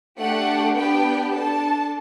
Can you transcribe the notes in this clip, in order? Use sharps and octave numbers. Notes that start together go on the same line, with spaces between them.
A3 D4 G4 F#5
B3 D4 G4 G5
D4 A4 A5